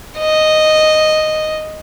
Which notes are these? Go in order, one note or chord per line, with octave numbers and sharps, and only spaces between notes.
D#5